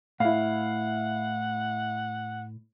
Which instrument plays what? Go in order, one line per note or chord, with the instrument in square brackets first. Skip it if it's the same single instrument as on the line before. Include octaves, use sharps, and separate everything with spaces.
[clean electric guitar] A2 [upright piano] E4 F5 [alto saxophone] F#5